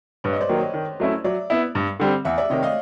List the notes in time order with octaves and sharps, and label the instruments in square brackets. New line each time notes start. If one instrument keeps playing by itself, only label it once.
[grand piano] G2 [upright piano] B4 C#5
[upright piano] D#5
C5 D5
[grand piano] D#3 F#3 A#3
[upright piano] C#5 D#5
[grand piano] D#3
F#3 A3 C#4 E4
[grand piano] F#3 [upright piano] D5 E5
[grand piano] B3 E4
G2
D3 G3 C4
[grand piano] E2 [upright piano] E5 F#5
[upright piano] D5 E5
[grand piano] C3 D#3 [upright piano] C#5 D#5
[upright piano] D#5 F5